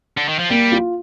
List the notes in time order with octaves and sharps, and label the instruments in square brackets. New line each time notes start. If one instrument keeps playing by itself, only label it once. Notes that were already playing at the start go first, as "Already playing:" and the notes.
[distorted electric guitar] D3
D#3
F3
[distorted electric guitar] G3 [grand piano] A#3
[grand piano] F4